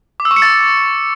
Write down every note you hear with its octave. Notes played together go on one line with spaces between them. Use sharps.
D6
E6
C#6
C#7
A6